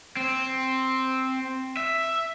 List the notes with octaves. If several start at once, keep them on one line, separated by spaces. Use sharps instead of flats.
C4
E5